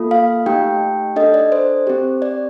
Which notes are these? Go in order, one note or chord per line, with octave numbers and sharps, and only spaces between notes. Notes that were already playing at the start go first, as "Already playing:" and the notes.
Already playing: A#3 F4 A4
F5
A3 D#4 G4 G5
D4 A4 D#5
D5
C5
C4 G4
D5